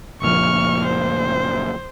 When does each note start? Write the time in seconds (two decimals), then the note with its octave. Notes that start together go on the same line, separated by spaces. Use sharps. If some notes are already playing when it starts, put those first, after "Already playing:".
0.21 F#1 A#2 F3 C#6 F6
0.84 C5